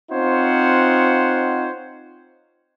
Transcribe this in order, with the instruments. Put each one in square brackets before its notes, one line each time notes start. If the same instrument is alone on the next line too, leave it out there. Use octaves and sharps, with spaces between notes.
[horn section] C4 D#4 F4 C5 C#5 F#5